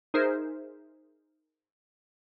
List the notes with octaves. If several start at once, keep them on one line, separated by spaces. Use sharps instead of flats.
D#4 G#4 A#4 C5 E5